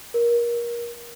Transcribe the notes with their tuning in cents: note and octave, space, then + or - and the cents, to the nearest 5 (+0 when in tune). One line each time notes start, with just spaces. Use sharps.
A#4 +25